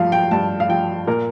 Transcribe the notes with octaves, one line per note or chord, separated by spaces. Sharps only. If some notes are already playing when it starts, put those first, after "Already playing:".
Already playing: G2 F3 F5
G5
G2 A5
F5
F3 G5
A#2 A#4